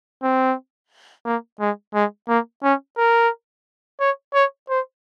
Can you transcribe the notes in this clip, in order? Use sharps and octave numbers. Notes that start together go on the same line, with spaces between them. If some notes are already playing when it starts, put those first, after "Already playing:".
C4
A#3
G#3
G#3
A#3
C#4
A#4
C#5
C#5
C5